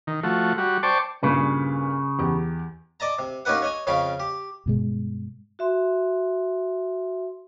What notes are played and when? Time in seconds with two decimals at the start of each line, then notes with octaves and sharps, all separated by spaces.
0.07 D#3
0.23 F3 A3 F#4
0.58 G3 F#4
0.83 C5 D5 G5 A5 C#6 D6
1.23 G2 A#2 C#3 B4
2.19 E2 G4
3.00 D5 D#5 A5 A#5
3.19 C3
3.45 A#3 C#4 D#4 G4 B4 F#5
3.62 C#5 D#5 G#5
3.87 F2 C#3 C#4 F5 G5 B5
4.20 G4
4.66 G2 B2 G#3
5.59 F#4 E5 C6